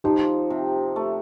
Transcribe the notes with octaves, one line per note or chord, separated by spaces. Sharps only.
F3 D#4 G4
C3
A3